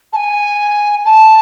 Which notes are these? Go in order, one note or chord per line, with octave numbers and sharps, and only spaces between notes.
A5
G#5
A5